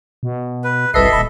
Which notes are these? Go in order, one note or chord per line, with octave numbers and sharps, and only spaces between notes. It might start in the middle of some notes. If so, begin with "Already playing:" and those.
B2
B4
G1 C2 A4 B4 D#5 E5 C7
D#1 B5